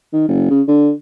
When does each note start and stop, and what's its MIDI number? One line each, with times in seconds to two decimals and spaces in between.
0.13 0.24 51
0.28 0.50 30
0.50 0.62 49
0.68 0.91 50